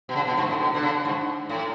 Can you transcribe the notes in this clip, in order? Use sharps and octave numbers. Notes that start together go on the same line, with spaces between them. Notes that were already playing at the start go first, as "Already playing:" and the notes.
B2
C#3
B2
G#2
A2
B2
D3
C#3
G#2
A2